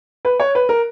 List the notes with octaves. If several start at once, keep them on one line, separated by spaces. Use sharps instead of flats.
B4
C#5
B4
A#4